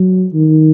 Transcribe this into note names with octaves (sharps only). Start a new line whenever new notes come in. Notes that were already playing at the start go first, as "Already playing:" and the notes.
Already playing: F#3
D#3